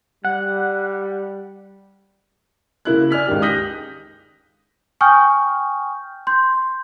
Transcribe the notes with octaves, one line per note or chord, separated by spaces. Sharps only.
G3 F#5
C#3 A#3 E4 F#6
D5 G#5 F6 B6
C#2 D#3 G4
D#6 F#6 G6 A#6 B6
G5 G#5 C#6 D#6 F6 G6
C6 G6